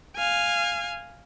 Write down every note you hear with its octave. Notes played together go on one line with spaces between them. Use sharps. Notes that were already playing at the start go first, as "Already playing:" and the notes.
F5 G#5